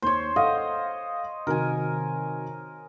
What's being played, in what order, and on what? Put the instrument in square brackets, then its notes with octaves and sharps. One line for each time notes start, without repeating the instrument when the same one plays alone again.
[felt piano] D#2 [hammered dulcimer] C5 C#5
[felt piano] A4 F5 F#5 [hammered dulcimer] D#5
[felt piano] C3 D#3 F#4 [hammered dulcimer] A#4 G#5